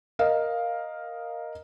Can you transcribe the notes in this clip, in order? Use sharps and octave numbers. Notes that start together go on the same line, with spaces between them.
A#4 D#5 F5